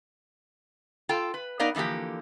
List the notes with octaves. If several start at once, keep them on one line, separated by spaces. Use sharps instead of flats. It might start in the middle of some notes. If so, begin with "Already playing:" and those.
F4 A4 G5
B4
B3 D#4 A#4 D5 D#5 F5
D3 E3 F3 A#3 G4